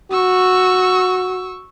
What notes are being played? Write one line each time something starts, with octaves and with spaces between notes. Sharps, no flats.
F#4 C#6 E6